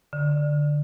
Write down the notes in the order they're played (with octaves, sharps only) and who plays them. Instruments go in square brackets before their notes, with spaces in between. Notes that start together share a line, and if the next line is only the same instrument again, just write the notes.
[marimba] D3